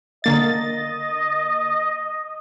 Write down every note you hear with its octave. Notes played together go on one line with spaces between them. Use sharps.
D3 A#3 D#5 A6